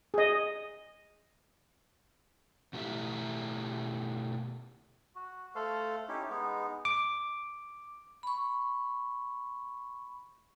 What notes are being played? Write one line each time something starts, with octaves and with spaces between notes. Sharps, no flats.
G#4 D#5
B2 A3 D#4 E4 G4 E5
F#4
A3 A4 C5 F5
C#4 D#4 E4 G4
G#3 B3 D#4
D6
B5 C#6